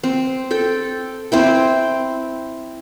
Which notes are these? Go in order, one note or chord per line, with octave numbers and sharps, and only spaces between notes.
C4
A4 G5
C4 E4 G5